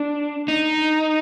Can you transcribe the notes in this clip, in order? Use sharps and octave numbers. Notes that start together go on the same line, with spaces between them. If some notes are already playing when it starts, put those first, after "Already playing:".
Already playing: D4
D#4